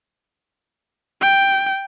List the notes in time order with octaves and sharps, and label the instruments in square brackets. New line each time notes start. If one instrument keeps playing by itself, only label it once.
[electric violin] G5